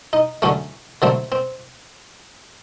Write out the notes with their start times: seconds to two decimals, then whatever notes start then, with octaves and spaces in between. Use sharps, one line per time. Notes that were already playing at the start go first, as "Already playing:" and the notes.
0.13 D#4
0.42 D3 F#3 A3 C#4
1.02 D3 F#3 A3 C4
1.32 C4